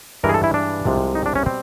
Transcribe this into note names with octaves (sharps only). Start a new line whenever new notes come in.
G2 E3 G#3 A#4
G#4
A4
E4
D4
C2 C3 F3 G#3
D#4
D4
C#4
B2 G3 C4